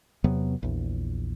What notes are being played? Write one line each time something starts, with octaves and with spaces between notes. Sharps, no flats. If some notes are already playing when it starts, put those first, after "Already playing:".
E2 C3 F#3 B3
A#1 E2